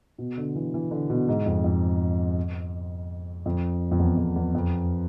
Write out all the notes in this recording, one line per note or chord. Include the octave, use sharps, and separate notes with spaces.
B2
D3
E3
E3
D3
B2
G#2
F2
F2
F2
F2
E2
F2
E2
F2